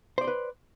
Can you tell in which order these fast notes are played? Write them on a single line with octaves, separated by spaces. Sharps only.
C5 D5 C6 B4